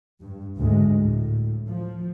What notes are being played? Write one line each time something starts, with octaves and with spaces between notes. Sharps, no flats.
G2
D2 G#2 G#3
A2
F3